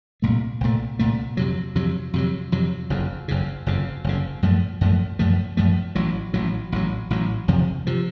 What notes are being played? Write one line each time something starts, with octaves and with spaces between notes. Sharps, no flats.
C2 A#2 A3
C2 A#2 A3
C2 A#2 A3
F2 C3 F#3
F2 C3 F#3
F2 C3 F#3
F2 C3 F#3
F#1 F2 C#3
F#1 F2 C#3
F#1 F2 C#3
F#1 F2 C#3
F#2 F3 A3
F#2 F3 A3
F#2 F3 A3
F#2 F3 A3
A1 A2 F#3
A1 A2 F#3
A1 A2 F#3
A1 A2 F#3
F#1 F2 C3 F3
C3 F3